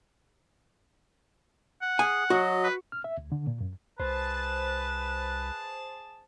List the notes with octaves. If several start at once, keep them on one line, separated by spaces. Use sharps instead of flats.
F#5
G#4 G#5
F#3 F#4 D#5
B4
F6
E5
D2
D3
A#2
F#2
C2 G#4 B4 C5 A5